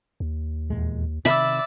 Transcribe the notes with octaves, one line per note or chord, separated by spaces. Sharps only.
D#2
E2 A#2 G#3
C3 D#3 D5 E5 B5 E6